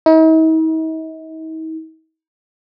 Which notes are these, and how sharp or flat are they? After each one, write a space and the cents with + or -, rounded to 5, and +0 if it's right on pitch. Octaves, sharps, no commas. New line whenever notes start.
D#4 +45